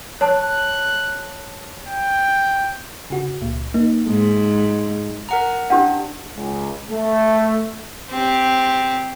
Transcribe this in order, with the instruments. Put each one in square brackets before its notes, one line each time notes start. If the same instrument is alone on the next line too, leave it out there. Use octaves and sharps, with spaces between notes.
[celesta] C#5 A5 [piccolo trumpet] F#6
[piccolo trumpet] G5
[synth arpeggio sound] C#3 F#4
C#2 A#2
A#3 D#4
[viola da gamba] G#2
[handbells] A#4 F#5 A#5
[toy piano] C#4 G4 F#5 [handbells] D4
[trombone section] C#2
A3
[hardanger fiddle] C4 G4